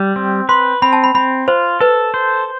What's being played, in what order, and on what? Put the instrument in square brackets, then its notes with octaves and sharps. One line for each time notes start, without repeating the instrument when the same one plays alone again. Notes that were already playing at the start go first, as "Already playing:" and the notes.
Already playing: [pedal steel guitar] G3
C4
[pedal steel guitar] B4 [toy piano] C6
[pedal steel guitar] C4 [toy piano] B5
[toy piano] A5
B5
[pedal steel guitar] C4 [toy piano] B5
[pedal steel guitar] F4 [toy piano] C5
[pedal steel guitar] A4 [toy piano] B4
[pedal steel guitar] C5